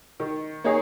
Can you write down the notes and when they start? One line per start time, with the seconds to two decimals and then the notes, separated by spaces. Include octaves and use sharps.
0.20 D#3
0.64 A#3 D#4 G#4 C#5